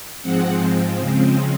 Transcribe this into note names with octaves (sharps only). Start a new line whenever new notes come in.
G#2 F3 G#3 C4 F#5
C#3 F3 G#3 C4